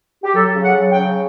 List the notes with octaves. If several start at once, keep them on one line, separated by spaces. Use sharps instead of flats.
G4
F#3 A4
C#3
F#5
F#3
G5
C#3